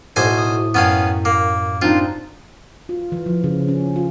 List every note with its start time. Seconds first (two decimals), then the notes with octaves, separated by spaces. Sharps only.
0.16 B1 A2 C5 G#5 E6
0.38 D#6
0.75 F#2 B3 C#4 F5 G5
1.25 A#3
1.82 C4 D4 D#4 F4
2.89 F4
3.12 E3
3.26 F3
3.44 C#3
3.68 C#4
3.96 F4